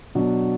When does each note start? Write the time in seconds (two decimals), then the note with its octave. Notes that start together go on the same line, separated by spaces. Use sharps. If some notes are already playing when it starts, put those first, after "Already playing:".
0.15 B2 F#3 D4 F#4